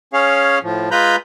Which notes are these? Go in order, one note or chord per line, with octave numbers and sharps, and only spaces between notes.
C#4 G#4 C#5 F5
A2 F3
G#3 F4 B4 A#5 B5 G6